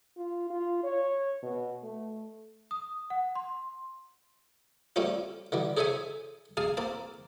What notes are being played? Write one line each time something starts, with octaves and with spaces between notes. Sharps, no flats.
F4
F4
C#5
B2
A3
D#6
F#5
C6
G3 A3 C4 C#4 F4
D3 E3 G3
G#4 A4 C5 C#5 E5 G#5
G#4 F5 G#5 A5
A#3 C4 A5